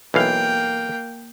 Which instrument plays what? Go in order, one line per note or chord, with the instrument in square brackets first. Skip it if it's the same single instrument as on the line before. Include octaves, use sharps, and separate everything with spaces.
[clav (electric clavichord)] B1 E3 F5 [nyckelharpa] A#3 G5